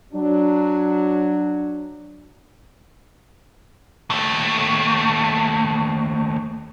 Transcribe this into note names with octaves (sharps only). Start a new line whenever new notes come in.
F#3 D4
D#2 A3